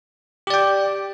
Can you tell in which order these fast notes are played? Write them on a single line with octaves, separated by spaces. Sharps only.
G4 D5 G5